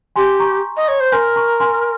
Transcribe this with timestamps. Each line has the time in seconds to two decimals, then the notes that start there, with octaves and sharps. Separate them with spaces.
0.16 G4 G#5 C6
0.40 A#5 C#6
0.76 D#5
0.88 C#5
1.00 C5
1.12 A#4 G#5 C6
1.36 A#5 C#6
1.60 G#5 C6